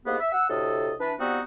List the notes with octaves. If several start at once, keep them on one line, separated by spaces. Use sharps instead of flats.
C2 G#2 A#3 B3
E5
F#5 E6
D2 A2 C3 A4 D#5
E3 D4 B4
F3 G3 B3 C4 D#4 F#4